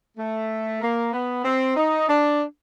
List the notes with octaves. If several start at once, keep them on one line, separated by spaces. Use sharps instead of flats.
A3
A#3
B3
C4
D#4
D4